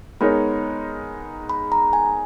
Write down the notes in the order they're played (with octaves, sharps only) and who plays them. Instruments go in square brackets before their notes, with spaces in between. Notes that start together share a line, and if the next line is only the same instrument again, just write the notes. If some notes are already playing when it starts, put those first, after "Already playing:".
[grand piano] G#3 B3 D#4 A#4 C#5 [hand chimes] B5
[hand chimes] B5
A#5
G#5